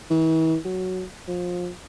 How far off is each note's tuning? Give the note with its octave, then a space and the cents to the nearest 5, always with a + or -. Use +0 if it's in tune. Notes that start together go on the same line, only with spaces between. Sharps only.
E3 -40
F#3 +5
F3 +25